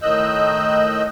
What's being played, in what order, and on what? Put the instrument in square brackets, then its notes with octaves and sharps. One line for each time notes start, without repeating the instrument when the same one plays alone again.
[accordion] A2 D#3 D#5 E6 F#6 G6